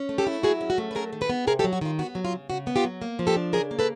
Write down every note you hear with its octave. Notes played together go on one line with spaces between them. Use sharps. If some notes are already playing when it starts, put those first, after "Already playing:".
Already playing: C#4
A3
G4 A4
E4
F#3 F#4 G#4
C#4
F#4
A3
B4
F#3 G#4 A#4
D#3
A4 B4
B3
C3 G#4 A#4
G4 A4
F#3
F#4
D#3 F4
B3 F#4
F#3
F4
C#3
C#3 F#4
B3
F4 G4
F#3
A#3
F3
G4 A4
D4
C#3 G#4 A#4
A#3
A4 B4